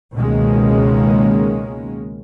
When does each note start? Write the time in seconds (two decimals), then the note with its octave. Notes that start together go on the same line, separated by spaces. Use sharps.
0.16 C#2 B2 D#3 G#3 A#3 C#4